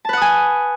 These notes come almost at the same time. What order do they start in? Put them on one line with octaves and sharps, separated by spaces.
A5 B4 F#5 D#6 G#5